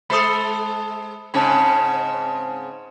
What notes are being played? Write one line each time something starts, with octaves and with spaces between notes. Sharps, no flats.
G#3 A4 C5 B5 D#6
G#2 C#3 C4 A5 B5